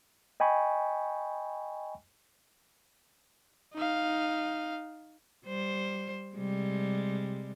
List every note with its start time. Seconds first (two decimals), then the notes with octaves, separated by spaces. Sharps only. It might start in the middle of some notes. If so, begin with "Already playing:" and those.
0.40 D#5 G5 G#5 B5 C#6
3.75 D#4 F5
5.46 G3 C5
6.36 C3 G3 G#3